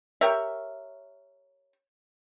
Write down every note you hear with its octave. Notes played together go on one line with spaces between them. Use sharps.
G4 A#4 C#5 E5